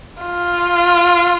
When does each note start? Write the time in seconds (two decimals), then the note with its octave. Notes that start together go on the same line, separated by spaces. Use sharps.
0.23 F4